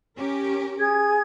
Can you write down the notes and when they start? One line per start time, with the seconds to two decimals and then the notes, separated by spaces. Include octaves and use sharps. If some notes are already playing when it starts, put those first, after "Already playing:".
0.16 C#4 G4 A#4
0.77 G#4 G#6